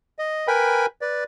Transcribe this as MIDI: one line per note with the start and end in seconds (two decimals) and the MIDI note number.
0.19 0.47 75
0.47 0.86 70
0.47 0.86 71
0.47 0.86 79
0.47 0.86 80
0.47 0.86 83
1.01 1.24 71
1.01 1.24 74